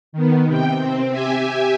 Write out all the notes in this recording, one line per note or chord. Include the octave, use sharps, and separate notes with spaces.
D#3 B3
C3 G5
C4
G4 E5 G#5